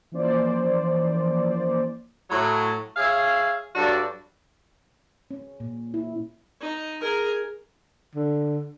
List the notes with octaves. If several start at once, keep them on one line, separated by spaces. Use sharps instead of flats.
E3 F3 A#3 C#4 C5 D5
A2 F#3
G#4 C#5 E5 F5
G2 F#3 D4 F#4 A4 D5
C#4
A#2
E4
D#4
G#4 A#4
D3